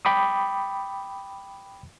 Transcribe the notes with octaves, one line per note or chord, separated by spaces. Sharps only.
G5 B5 D6 D#6